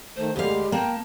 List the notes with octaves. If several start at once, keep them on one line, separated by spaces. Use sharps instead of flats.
D#3 A3 C5
D2 G3 G#3 G4 F5
A#3 G5 A5